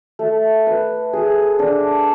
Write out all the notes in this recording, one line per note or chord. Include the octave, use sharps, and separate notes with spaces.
A3
B4
G#4
D4